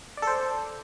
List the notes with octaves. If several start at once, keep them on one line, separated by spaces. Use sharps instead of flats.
A4 C5 D5